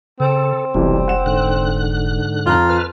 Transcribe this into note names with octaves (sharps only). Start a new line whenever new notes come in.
C#3 C4 A4
F1 B1 C3 E3 G3
F#5 E7
G#2 D3 F#6
F2 F4 A#5
B4 F6